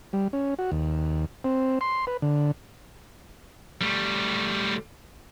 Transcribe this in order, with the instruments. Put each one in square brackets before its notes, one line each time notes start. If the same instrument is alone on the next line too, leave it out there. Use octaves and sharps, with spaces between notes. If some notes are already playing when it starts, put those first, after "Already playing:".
[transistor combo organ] G3
C#4
F#4
D#2
C4
C6
B4
D3
[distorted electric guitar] G3 A3